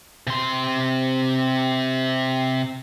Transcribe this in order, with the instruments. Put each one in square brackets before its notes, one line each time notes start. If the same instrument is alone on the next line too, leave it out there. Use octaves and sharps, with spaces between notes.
[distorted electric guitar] C3 C6